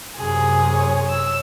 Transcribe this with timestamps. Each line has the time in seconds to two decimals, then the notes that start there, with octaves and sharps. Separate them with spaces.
0.17 F#2 C3 G#4
0.74 C#5
1.10 E6